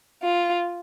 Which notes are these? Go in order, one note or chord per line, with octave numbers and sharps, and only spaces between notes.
F4